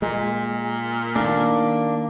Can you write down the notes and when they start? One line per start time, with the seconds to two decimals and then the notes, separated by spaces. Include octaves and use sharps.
0.02 A#2 G#3
1.16 D#3 A3 A#3 D4